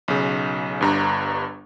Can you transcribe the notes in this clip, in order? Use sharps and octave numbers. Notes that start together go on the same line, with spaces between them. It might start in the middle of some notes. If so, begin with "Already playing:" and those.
B1 C#3
G1 G2 A#5